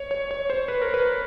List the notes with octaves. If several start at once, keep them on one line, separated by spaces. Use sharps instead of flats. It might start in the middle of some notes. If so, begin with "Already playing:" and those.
Already playing: C#5
C#5
C#5
C5
B4
A#4
B4